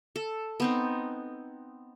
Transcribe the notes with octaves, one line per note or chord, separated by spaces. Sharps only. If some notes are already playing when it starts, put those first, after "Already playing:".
A4
B3 C4 D#4